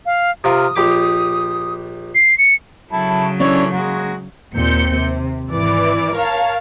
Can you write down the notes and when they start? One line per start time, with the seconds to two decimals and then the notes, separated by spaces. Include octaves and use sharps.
0.06 F5
0.44 C3 F4 A#4 D#6
0.76 A#1 G4 D6
2.15 C7
2.38 C#7
2.92 C#3 F#3 E4 A4
3.40 E3 A3 C#4 D4 C#5 D5
3.72 G#3 A#3 F#4
4.53 D#2 A#2 C4 G6 C#7
4.96 C3
5.48 G#1 E3 D5 D6
6.15 A#4 C#5 F5 A5